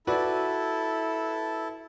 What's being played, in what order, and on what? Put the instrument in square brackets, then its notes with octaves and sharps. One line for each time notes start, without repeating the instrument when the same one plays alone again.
[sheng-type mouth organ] E4 A4 [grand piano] F#4 B4 D5